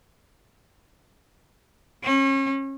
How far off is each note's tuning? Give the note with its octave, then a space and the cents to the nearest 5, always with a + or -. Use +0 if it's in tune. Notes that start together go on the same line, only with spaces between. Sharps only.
C#4 -35